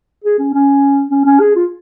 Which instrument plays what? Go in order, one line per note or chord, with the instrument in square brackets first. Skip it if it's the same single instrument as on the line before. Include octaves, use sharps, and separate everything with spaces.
[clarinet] G#4
C#4
C#4
C#4
C#4
G#4
F4